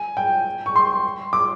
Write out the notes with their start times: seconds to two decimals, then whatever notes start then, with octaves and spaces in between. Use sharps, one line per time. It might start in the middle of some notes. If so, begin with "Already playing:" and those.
Already playing: G#5
0.17 G5
0.66 C#6
0.76 C6
1.33 D6